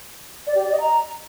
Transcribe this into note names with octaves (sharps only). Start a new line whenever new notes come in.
D5
G4
D5
D#5
A#5